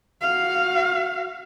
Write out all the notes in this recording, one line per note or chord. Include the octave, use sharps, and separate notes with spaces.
F#4 F5